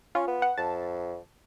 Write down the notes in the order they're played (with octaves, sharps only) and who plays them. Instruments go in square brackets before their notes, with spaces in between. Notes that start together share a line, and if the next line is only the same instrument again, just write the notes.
[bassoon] C#4 [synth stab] F4
[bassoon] B3
[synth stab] F#5
[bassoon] F2 [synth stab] A5